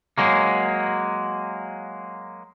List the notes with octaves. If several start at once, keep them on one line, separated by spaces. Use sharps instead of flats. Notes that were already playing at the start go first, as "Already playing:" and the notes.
F#3 G#3 A#3